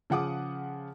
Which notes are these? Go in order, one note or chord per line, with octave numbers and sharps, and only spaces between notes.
C#3 F3 F#5 D6 D#6